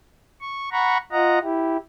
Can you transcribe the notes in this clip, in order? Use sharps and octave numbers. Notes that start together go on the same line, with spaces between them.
C#6
F#5 A#5 B5 C#6
F4 D#5 F#5 A#5
E4 G4